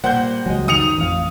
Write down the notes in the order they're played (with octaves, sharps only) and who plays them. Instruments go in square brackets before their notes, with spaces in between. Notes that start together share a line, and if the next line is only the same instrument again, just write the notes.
[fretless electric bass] A#2 [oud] G3 A#3 C5 [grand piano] F#5 G6
[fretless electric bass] C#2 F#3 [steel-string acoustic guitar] G#3 D#5
[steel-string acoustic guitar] F#2 D#3 [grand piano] D#6 C#7 F7
[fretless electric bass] A1 F3 [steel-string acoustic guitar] F2 F5